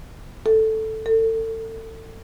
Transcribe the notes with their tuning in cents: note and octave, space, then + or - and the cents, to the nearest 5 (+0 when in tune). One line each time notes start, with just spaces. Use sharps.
A4 +0
A4 +30